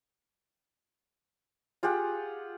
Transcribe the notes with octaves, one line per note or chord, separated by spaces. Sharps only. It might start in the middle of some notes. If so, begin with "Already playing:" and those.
F4 G4 G#4 F#5